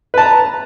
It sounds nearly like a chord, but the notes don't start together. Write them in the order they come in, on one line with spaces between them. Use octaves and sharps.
B4 A5 A#5